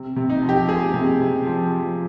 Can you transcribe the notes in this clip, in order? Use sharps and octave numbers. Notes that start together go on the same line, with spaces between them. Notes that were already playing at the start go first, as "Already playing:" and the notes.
Already playing: C3
C3
D#4
F3
G4
G#3 G#4
C3
C3
F3
F3